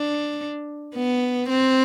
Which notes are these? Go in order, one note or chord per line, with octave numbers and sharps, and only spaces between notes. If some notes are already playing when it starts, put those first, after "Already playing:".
Already playing: D4
B3
C4